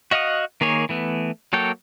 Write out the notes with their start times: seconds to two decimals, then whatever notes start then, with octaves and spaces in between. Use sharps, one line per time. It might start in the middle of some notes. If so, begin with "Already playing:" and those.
0.11 F#4 D#5 F5 F#5 D#6
0.61 D#3 A#3 G#4 C#5
0.89 E3 A3 B3
1.53 F#3 A#3 A4 C#5 G5